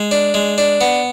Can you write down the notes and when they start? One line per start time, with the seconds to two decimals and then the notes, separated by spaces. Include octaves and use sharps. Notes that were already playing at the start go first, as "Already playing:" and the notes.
Already playing: G#3
0.11 D4
0.34 G#3
0.58 D4
0.81 B3